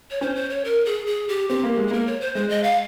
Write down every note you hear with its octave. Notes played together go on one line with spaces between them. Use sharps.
C#5
C#4 C5
C5
C#5
A#4
G#4
G#4
G4
C4 G4
A#3
G#3
G#4
A#3 A#4
C#5
C5
G#3 C5
D#5
F5